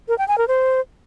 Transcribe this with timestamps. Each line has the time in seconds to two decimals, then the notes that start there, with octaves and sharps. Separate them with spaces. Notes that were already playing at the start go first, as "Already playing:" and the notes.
0.08 A#4
0.18 G5
0.28 G#5
0.38 A#4
0.48 C5